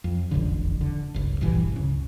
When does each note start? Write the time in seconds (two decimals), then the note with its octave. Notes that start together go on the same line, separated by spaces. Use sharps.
0.04 F2
0.31 E1 A1 F2 D3
0.81 D3
1.14 G1 C#2
1.41 D1 A#1 G2 E3
1.72 C#2 C#3